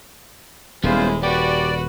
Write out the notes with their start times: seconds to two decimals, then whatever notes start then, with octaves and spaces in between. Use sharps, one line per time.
0.84 D#1 G3 G#3 B3 C#4 E4 F4 C5
1.23 F#4 G4 B4 D5